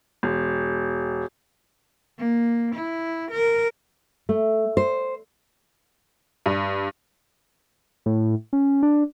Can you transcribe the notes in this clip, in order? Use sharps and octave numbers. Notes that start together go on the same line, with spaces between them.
E1
A#3
E4
A#4
A3
C5
G2
A2
C#4
D4